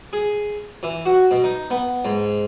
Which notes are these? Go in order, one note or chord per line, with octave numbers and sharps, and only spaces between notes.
G#4
E3
F#4
B2
D#4
B3
G#2